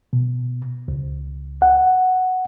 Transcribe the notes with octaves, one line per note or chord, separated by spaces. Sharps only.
B2
C#2
F#5